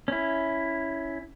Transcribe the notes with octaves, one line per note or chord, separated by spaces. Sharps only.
C#4 E4